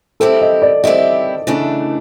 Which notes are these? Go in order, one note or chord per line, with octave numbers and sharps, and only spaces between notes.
G3 C4 E4 G4 A4
D#5
D5
G3 C4 E4 G4 D#5
C#3 E3 A3 D4